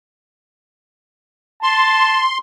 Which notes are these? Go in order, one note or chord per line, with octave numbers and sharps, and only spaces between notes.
A5 C6